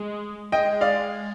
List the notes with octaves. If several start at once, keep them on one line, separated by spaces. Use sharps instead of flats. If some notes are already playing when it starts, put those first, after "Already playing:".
Already playing: G#3
G#3 D#5 G5
D5 F5